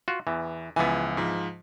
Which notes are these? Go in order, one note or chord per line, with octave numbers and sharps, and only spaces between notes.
F4 F#4
E2 E3
C#2 E3 F3 B3 G#5
G#2 F3